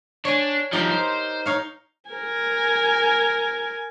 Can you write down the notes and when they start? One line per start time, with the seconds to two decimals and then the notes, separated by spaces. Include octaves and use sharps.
0.25 D4 C#5 G#5
0.73 G2 F3 D#4 G4 A#4
0.91 C5
1.46 D#4 C#5 F5
2.10 A#4 G#5